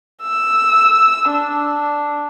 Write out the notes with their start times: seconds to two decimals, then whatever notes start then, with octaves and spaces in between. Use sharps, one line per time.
0.22 E6
1.30 D4